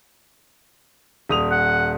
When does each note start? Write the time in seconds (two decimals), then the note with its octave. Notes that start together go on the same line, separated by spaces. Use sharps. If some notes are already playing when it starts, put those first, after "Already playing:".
1.29 D#1 D#6 F7
1.51 F#5